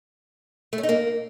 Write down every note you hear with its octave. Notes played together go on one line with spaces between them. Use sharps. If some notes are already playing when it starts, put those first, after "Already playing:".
A3
C#4
D#4
A#3